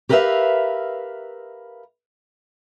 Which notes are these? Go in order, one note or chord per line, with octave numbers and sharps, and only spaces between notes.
G4 A#4 B4 D5 E5 F5